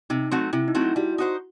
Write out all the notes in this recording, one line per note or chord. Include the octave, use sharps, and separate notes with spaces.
C3 D#4
F#3 A3 C4 F#4
C3 E4
D#4
F#3 A3 C4 F#4
E4
G3 F#4
D#4 F#4 C5